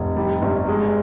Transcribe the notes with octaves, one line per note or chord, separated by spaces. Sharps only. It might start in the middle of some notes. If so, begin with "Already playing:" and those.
Already playing: F1
G3
G1
G#3